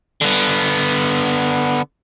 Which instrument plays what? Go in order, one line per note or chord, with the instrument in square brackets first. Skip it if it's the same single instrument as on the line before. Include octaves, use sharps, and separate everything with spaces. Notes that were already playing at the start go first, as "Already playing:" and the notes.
[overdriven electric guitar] D3 B3